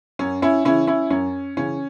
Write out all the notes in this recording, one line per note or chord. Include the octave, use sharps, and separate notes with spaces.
F#2 C#4
C#4 E4
C#3 E3 C#4 E4
C#4 E4
F#2 C#4
C#3 E3 C#4